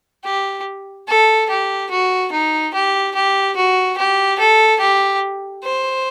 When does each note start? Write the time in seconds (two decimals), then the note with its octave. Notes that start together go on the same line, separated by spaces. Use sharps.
0.25 G4
1.08 A4
1.50 G4
1.90 F#4
2.32 D#4
2.74 G4
3.15 G4
3.56 F#4
3.98 G4
4.39 A4
4.80 G4
5.63 C5